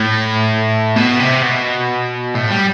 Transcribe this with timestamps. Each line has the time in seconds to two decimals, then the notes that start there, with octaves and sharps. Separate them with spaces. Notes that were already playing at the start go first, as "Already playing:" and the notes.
Already playing: A2
0.96 B2
1.20 C3
1.43 B2
2.35 A2
2.51 G3